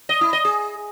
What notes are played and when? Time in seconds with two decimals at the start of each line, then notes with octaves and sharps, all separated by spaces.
0.09 D#5
0.21 E4
0.33 D#5
0.45 G#4